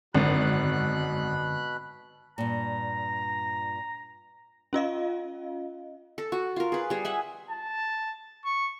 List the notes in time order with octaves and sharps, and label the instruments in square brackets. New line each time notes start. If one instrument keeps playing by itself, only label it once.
[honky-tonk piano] G#1 [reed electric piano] F#2 D3 [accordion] B2 B5 F#6
[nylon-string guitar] G2 A#2 [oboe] A#5
[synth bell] C#4 F4 D#5 F5
[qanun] A4
F#4
F4 A#4
G#4 B4
G3 G#4
E5 F#5 G#5
[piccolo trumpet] A5
C#6